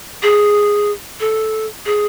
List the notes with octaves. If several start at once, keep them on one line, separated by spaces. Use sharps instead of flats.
G#4
A4
G#4